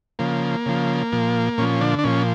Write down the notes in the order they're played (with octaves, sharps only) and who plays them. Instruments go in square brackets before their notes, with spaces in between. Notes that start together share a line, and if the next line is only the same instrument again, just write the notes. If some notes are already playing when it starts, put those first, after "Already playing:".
[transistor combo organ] C#3 F3 A#3
C#3 F3
A#2 F3
A#2 F3 C#4
D3 D4
D4
A#2 F3 C#4